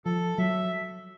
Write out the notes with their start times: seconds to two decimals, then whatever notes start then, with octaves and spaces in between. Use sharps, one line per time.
0.05 F3 A4
0.38 F#3 E5